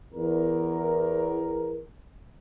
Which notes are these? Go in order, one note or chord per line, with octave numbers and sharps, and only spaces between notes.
E2 A#4